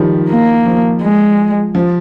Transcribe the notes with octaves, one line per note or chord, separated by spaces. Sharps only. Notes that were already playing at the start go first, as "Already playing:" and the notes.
Already playing: D#3 F3 G3
A#3
F3
G#3
F3